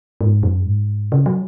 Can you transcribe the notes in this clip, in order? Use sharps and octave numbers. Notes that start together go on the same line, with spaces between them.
G#2
F#2
G#2
C#3
F#3